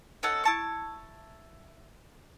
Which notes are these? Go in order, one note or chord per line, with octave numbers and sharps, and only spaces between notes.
C#4 D#4 A4 F#5
E4 A5 C#6